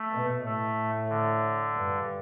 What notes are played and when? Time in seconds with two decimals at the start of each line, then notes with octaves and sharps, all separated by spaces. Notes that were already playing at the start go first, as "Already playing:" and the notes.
Already playing: A3
0.12 B2
0.45 A2 A3
1.09 D3
1.74 G2